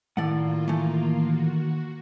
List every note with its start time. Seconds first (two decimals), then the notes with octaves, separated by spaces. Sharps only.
0.17 A2 D#3 A#3 F4 D5 F#5
0.68 E3 A3
1.17 F#4